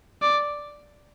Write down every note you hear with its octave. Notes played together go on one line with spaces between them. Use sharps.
D5